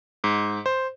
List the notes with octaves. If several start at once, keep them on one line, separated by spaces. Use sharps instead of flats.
G#2
C5